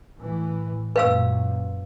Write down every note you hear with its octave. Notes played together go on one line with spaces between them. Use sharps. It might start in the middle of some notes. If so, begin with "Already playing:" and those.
A2 E3
F#2 A#2 B4 F5 E6